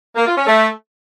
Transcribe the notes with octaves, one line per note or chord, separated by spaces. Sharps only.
A#3
F4
C#4
A3